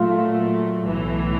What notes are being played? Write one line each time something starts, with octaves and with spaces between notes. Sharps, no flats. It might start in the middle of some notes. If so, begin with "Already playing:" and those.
Already playing: A#2 F#3 A3 F4
B1 A2 E3